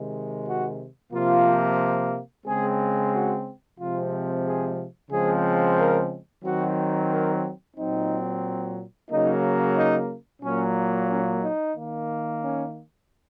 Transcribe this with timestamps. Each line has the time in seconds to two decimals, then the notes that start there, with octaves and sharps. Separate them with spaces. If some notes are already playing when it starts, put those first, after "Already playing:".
Already playing: C3 D#3 G#3
0.46 F#4
1.12 C3 F3 A#3 F4
2.46 C#3 G#3 C4 G#4
3.12 F#4
3.79 C3 F3 G#3 C4 F4
4.45 G#4
5.11 C#3 F3 G#3 C4 G#4
5.77 A#4
6.44 D#3 F#3 C4 F#4
7.11 A#4
7.76 A#2 F#3 C4 D#4
9.10 C#3 F#3 A#3 D#4
9.76 D#4
10.42 A#2 F#3 A#3 C#4
11.09 C#4
11.42 D#4
11.75 D#3 A#3
12.42 C#4